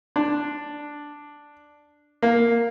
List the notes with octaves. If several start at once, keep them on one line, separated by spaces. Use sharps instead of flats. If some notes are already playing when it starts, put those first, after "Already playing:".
D4
A#3